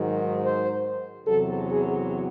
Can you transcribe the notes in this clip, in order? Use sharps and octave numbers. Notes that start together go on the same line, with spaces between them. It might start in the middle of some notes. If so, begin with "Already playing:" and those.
Already playing: G#2 D#3 F#3
C5
E2 C3 F#3 A4
G#4